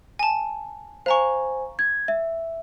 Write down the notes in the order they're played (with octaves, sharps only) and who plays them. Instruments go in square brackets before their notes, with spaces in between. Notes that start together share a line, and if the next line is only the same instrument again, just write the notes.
[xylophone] G#5 A5
[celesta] C5 G#5 [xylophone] F5 A#5 C#6
[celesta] G#6
E5